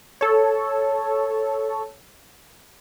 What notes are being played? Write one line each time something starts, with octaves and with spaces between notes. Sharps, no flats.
A4 C#5